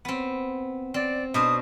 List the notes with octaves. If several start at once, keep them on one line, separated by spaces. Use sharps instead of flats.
B3 C4
C4 D5
B2 D4 C5 D#6